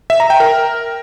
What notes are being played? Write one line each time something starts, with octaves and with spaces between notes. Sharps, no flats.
E5
A#5
G5
A#4